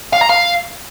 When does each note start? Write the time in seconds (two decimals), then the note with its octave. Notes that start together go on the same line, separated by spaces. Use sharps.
0.13 F5
0.21 A#5
0.29 F5